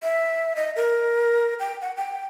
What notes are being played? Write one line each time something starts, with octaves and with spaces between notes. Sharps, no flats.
E5
D#5
A#4
G5
F#5
G5